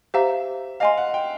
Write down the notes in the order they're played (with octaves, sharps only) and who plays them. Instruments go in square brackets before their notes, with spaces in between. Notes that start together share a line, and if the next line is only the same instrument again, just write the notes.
[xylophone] G4 C5 F5 A#5 [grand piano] E5
[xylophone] D#5 G#5 C6 [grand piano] F5
[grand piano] F#5
G5